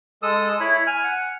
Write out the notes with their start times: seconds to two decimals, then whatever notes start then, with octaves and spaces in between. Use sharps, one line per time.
0.23 G#3 A4 D#6 E6
0.60 E4 C#5 B5
0.87 G#5 F6
1.04 F#5